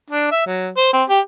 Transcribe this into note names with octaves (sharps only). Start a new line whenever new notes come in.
D4
E5
F#3
C5
C4
G4